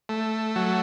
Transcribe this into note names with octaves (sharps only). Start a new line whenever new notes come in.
A3
F#3